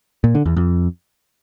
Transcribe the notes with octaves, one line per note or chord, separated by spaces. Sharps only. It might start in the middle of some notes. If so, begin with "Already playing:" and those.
A#2
D3
E2
F2